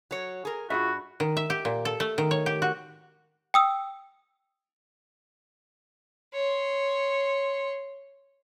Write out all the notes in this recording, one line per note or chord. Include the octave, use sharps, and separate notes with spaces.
F#3 C#5
G#4 A#4
G2 F4 F#4 G#4 E5
D#3
E5
G4
A#2
A4
A3
D#3
C#5
G4
F#4
G5 D#6 E6
C#5 C6